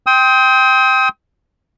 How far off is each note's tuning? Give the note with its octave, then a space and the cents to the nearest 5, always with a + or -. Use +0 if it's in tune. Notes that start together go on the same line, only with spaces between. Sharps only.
G5 +0 C6 +0 D#6 +40